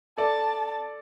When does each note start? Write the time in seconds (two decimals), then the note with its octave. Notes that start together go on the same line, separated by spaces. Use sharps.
0.18 A4 D5 A5